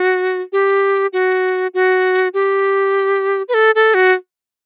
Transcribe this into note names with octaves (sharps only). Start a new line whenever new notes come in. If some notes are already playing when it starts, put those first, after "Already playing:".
Already playing: F#4
G4
F#4
F#4
G4
B4
A4
A4
F#4